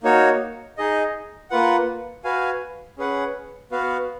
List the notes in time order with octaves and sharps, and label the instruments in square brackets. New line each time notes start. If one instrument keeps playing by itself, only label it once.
[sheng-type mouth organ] A#3 D#4 F#4 C#5
D#4 G#4 D#5
A#3 F4 B4 F#5
F#4 B4 F5 G#5
C#4 G#4 B4 F#5
B3 F#4 B4 F5